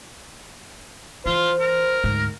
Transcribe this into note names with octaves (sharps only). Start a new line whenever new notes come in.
E3 F4 C5
A#4
D2 G#2